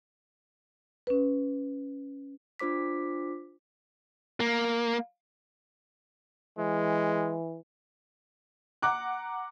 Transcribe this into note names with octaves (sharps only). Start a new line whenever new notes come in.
C#4 B4
D4 F4 C5 D6 B6
A#3
E3 G#3
F#5 A#5 D6 F#6